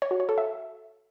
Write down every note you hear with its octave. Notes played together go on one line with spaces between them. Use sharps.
C#5
F#4
C#5
A4
E5